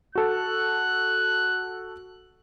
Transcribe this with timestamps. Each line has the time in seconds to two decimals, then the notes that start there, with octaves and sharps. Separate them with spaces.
0.15 F#4 A4 F#6